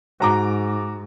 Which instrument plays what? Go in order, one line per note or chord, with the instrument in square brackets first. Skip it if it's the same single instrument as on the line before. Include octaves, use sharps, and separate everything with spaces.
[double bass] G#2 [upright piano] F#4 A#5 D6